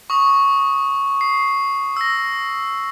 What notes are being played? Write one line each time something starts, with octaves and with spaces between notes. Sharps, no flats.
C#6 D#6
C7
E6 A#6